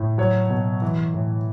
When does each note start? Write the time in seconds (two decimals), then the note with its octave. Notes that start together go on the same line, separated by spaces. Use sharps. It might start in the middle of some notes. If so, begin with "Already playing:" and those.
Already playing: A2
0.18 F#3 C#5
0.50 B2
0.82 E3
1.14 A2